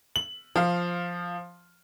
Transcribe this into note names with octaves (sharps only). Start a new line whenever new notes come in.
F#7
F3 F5